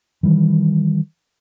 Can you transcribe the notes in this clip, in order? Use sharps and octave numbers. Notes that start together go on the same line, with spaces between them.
D#3 E3 G3